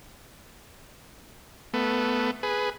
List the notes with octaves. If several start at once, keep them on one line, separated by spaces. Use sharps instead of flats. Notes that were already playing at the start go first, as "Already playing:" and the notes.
A3 B3
G#4 B4